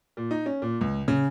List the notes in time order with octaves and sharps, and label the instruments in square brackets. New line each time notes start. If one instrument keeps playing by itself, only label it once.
[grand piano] A#2
D#4
C#4
A#2
C#2
C#3